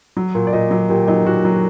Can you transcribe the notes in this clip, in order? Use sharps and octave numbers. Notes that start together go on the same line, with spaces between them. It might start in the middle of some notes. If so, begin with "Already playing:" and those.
F#3
A#2
D5
A#2 D#5
F#3
A#2 G4
F#3 D#4
A#2 F#4
F#3